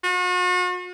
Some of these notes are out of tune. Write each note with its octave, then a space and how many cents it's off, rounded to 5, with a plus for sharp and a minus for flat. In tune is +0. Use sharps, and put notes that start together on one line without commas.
F#4 -40